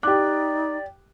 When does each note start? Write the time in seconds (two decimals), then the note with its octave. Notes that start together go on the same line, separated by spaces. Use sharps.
0.03 D#4 G4 D5 D6 F#6